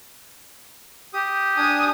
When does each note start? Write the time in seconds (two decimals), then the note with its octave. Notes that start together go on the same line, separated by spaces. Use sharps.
1.14 G4 D#6
1.57 D4 G#5 D#6